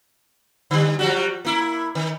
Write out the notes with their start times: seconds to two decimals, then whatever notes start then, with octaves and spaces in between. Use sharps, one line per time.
0.71 D3 G3
0.99 F3 G3 F#4
1.45 A#3 E4
1.95 D#3